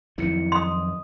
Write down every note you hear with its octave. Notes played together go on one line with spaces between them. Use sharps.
F2 D#3 F#3 E4 C#7
D#5 C6 D#6